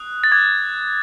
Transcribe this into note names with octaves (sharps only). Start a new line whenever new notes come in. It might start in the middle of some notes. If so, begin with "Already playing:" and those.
Already playing: D#6 F#6
A6
D6 F#6 G#6